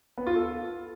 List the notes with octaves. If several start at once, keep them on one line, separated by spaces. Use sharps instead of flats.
B3
F4
A4